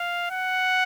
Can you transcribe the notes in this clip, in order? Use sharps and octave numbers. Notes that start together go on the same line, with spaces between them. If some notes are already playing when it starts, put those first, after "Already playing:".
Already playing: F5
F#5